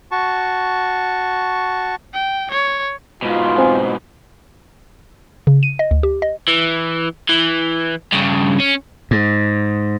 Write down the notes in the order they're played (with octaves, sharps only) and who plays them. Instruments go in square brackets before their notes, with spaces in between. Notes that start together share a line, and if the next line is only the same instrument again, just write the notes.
[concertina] F#4 A5 C#6
[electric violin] G5
C#5
[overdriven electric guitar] G#2 B2 [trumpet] F4
[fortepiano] C4 G#5
[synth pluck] C#3
D#7
D#5
D2
G4
D#5
[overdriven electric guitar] E3
E3
G2 C#3
C#4
[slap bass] G#2